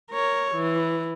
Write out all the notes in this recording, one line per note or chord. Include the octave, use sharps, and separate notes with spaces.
A#4 C#5
E3